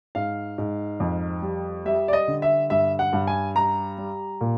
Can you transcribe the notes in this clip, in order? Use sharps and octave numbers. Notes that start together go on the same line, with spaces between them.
G#2 F5
G#2
F2
G3
G3 E5
D5
D#5
D3
E5
G2 E5
F#5
G2
G#5
G3 A#5
G3
A#2